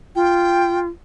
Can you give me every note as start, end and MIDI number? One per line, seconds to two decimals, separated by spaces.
0.15 0.88 65
0.15 0.79 79